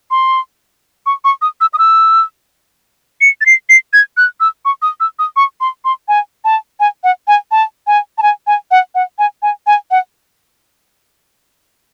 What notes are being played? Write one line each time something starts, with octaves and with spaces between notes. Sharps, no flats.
C6
C#6
C#6
D#6
E6
D#6
E6
C#7
A6
C7
C7
G#6
F#6
E6
C#6
D#6
E6
D#6
C#6
C6
C6
G#5
A5
G#5
F#5
G#5
A5
G#5
A5
G#5
G#5
F#5
F#5
G#5
G#5
G#5
F#5